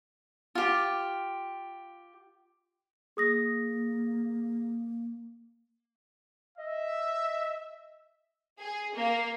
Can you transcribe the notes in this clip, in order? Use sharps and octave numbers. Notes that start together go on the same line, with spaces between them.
F4 G4
A#3 G#4 D#6 A#6
D#5 E5
G#4
A#3